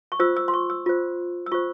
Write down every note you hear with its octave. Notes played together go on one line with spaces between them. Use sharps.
C#6
F4 C5 E6
E6
C6
C#6
E6
F4 C5
E6
F4 C5 C#6